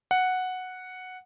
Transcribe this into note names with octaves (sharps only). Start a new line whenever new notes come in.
F#5